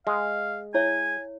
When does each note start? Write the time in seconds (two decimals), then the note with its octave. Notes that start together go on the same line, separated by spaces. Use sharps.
0.07 G#3 F5
0.74 E4 C#5 E5 G#5